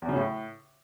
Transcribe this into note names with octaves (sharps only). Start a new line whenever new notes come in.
E2
C#3
A2